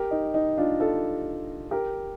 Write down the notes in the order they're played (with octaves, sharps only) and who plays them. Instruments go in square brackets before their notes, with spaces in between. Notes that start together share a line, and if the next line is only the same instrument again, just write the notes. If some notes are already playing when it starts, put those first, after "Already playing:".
Already playing: [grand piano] G4 A#4
D#4
D#4
D4 F4
F4 A4
G4 A#4